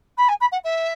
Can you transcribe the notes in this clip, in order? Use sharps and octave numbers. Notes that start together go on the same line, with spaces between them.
B5
G#5
B5
F#5
E5